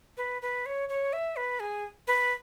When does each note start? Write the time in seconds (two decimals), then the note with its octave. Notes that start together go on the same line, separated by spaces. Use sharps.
0.17 B4
0.42 B4
0.66 C#5
0.89 C#5
1.13 E5
1.36 B4
1.60 G#4
2.08 B4